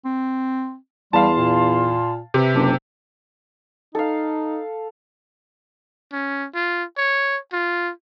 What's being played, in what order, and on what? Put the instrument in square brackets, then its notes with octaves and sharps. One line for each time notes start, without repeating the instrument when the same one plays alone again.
[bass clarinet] C4
[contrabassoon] E2 [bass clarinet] G3 [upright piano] F5 A5 [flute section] C6
[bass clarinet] A#2
[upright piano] C3 [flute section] B4 E5
[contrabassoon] F#1 [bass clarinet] D4
[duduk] D#4 [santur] A4 F5
[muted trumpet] C#4
F4
C#5
F4